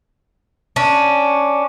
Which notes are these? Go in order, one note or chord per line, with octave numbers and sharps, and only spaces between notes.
C#4 D4